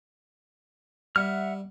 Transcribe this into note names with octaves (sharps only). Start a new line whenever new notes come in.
G3 E5 F#5 F6